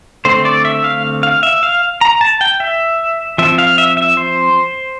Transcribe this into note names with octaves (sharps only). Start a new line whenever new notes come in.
D3 A3 C4 C5
D5
E5
F5
F5
E5
F5
A#5
A5
G5
E5
F3 C4 E5
F5
E5
E5
C5